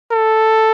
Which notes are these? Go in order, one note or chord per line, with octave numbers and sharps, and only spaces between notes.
A4